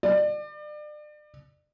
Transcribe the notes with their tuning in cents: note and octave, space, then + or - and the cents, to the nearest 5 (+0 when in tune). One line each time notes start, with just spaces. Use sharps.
D5 +35